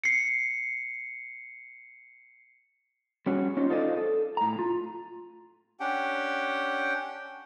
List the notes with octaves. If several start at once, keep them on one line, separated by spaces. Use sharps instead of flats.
C7 C#7
G3 C#4 F#4 G#4
C#4 D#4 F4 C5
D#4 F4 A4 C5 D5 D#5
A4
A2 A#5
F4
C#4 D4 G4 F#5 G5